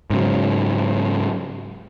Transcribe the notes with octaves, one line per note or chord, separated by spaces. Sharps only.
G#2 C#3 F#3